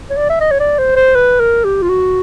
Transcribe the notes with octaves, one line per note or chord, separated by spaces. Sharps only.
C#5
D5
E5
D#5
C#5
D5
C5
C5
B4
A#4
G4
F4
F#4